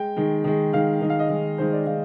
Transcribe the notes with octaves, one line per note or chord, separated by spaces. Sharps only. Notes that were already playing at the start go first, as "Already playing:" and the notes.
Already playing: G#3 G5
D#3 G#3
D#3 G#3
D#3 G#3 F5
D#3 G#3 D#5
F5
D#5
D#3 G#3
D#3 G#3 C5
D5
D#3 G#3 F5